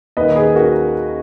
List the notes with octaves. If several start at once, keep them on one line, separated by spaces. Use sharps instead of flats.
D#2 D#3 B4 D#5
G#4 B4
F#4 A#4